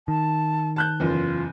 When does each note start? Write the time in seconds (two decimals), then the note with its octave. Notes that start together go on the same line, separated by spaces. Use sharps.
0.08 D#3 A5
0.76 A5 F#6 G6
1.00 F#1 E2 F4